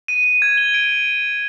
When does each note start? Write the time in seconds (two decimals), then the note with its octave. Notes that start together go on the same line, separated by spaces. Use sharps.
0.08 D#7
0.24 D#7
0.42 G#6
0.58 G7
0.74 D7